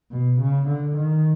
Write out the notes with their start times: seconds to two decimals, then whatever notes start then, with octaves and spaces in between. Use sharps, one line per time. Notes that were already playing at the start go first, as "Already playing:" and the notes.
0.12 B2
0.40 C#3
0.68 D3
0.96 D#3